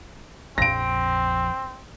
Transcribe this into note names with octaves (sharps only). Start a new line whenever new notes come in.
A#1 F2 C4 A#6 D7